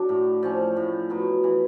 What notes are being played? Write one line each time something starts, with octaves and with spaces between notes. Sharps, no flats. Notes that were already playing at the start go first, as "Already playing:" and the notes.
Already playing: F#3 D4 F#4
A2
F3 A3 C#4
A2
F#3 B3
E3